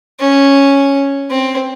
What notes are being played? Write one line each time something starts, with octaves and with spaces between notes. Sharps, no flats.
C#4
C4